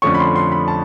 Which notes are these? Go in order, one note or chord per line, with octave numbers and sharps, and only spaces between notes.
F2 D3 F3 A3 C#4 C#6
B5
C6
C6
B5
A5